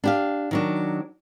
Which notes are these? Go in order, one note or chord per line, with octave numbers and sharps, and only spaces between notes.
D4 G4 F5
D#3 F#3 D4